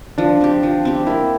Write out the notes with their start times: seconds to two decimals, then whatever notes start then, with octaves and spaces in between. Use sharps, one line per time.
0.18 F3 D4
0.41 C4 G4
0.63 F3
0.85 C4 G4
1.07 A#3 E4